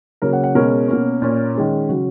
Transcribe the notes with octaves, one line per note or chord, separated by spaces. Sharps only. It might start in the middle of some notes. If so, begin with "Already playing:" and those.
C#3 F#3 A#3 C#4 A#4
F#5
F#5
B2 G#3 C#4 A#4
B2 A#3 C#4
A#2 A#3 C#4
D#3 G#3 C#4
C#3 F#3 C#4 F#4